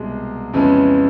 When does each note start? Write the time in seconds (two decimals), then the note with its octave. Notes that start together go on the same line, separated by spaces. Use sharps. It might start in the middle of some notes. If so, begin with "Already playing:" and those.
Already playing: C2 B2 G#3
0.53 F2 C#3 E3 G#3 B3